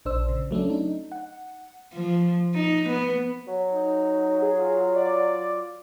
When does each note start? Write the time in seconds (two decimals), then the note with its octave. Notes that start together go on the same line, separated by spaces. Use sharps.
0.05 A#1 D4 C5 E6
0.29 C#3
0.51 F#3 A3 C#4 D4
0.70 D#4
1.12 F#5
1.94 F3
2.55 D#4
2.89 B3
3.48 F#3
3.72 D#4
4.42 G#4
4.58 F4
4.95 D5